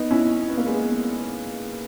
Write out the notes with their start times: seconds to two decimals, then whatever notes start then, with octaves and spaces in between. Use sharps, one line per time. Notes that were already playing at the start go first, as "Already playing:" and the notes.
Already playing: B3 D#4
0.11 C#4 E4
0.49 B3
0.58 A#3
0.66 G#3 B3